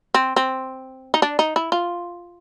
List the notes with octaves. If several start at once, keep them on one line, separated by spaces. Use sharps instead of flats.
C4
C4
D#4
D4
D#4
E4
F4